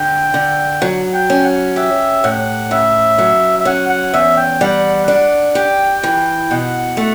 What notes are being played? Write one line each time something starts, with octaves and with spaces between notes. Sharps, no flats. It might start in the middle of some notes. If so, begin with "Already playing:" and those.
Already playing: D3 G5
D3
F#3 F#5
G5
C#4
F#5
G4 E5
A2 F#5
C#3 E5
F#3
E5
C#4 F#5
F#5
E2 E5
G5
G3 F#5
D4 F#5
G4 G5
E3
B2 F#5
A3